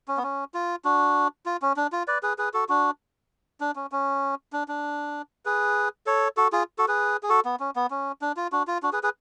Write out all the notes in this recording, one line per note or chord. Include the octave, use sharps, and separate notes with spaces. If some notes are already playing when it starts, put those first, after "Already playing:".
C#4
B3
C#4
F4
D4 F#4
F4
C#4
D4
F4
B4 D5
G#4 B4
G#4 B4
F#4 A4
D4 F#4
D4
C#4
C#4
D4
D4
G#4 B4
A4 C#5
F#4 A4
F4 G#4
F#4 A4
G#4 B4
G#4
F#4 A4
B3
C#4
B3
C#4
D4
F4
D4 F#4
F4
D4 F#4
G#4 B4
G#4 B4